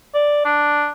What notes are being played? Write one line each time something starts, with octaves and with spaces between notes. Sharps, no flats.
D5
D4